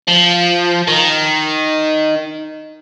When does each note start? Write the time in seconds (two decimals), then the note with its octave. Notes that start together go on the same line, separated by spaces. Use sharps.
0.08 F3
0.88 D#3